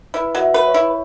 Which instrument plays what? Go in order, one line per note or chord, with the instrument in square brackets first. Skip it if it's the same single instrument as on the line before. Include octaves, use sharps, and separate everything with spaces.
[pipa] E4 [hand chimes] B4
[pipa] F#3
[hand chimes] E5
[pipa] B4
[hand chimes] C#5
[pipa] E4